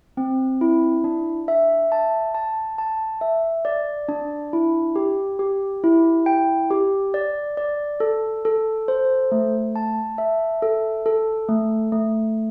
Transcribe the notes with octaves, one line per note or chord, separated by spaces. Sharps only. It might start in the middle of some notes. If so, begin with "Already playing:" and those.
C4
E4
D4
E5
A5
A5
A5
E5
D5
D4
E4
G4
G4
E4
G5
G4
D5
D5
A4
A4
C5
A3
A5
E5
A4
A4
A3
A3